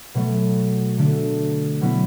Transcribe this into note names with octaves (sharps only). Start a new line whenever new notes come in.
B2 F#3 A3
D3 A3 D4 A4
B2 F#3 B3 E4